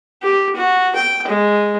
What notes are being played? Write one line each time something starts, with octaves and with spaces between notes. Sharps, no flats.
G4
F#4
G5
G#3